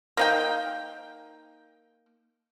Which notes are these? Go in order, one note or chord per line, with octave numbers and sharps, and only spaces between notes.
A#3 D#4 G5